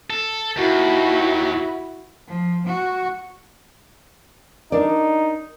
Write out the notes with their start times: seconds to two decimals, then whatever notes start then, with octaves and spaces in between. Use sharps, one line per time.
0.10 A4
0.57 D#2 E4 F#4
2.28 F3
2.66 F#4
4.72 D4 D#4 A#4 D5